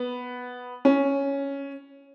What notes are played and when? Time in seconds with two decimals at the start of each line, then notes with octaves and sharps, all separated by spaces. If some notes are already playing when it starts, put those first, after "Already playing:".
Already playing: B3
0.85 C#4